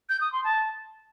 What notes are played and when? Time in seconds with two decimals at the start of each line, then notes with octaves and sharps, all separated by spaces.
0.09 G6
0.21 D#6
0.32 C6
0.44 A5